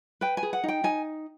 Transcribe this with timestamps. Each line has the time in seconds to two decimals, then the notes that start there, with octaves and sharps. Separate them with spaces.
0.21 B4 G5
0.37 G#5
0.43 G#4
0.53 F#5
0.64 D#4 G5
0.84 D#4 G#5